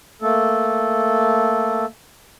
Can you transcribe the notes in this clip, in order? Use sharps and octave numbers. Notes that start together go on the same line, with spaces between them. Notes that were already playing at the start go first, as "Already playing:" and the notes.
A3 A#3 A4